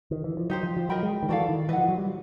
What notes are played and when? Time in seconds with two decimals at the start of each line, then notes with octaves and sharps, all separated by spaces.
0.11 D#3
0.24 E3
0.37 F3
0.50 F#3 D#4 G4 C5
0.63 F3
0.77 F3
0.89 F#3 A#4 D#5 G5 B5
1.03 G#3
1.23 D#3
1.29 E3 F#4 A4 D5 F5
1.49 D#3
1.69 E3 B4 D#5 F#5
1.78 F3
1.89 F#3
1.98 G3